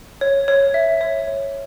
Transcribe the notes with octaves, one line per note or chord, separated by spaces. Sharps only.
C#5
C#5
E5
C#5
C#5